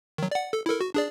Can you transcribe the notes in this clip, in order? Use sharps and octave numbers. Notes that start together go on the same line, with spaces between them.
D#3 F#3
D5 F#5
A4
E4 A4 A#4
F#4
D4 G#4 D5